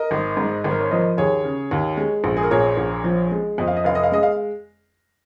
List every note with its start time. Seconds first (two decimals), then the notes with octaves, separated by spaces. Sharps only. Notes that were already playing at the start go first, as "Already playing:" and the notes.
Already playing: A#4 D#5
0.11 G#1
0.37 G#2
0.64 G#1
0.71 A#4
0.81 C#5
0.90 F3 A#4 D#5
1.18 D#2 G#4 C#5
1.44 C#3
1.71 D#2
1.97 G#3
2.24 A#1
2.37 G#4
2.43 A#4
2.51 A#2 G#4 C#5
2.77 A#1
3.04 F3
3.32 G#3
3.58 F2 D#5
3.68 F5
3.76 D#5
3.84 F1 F5
3.95 D#5
4.04 F5
4.12 G#3 D#5
4.23 F5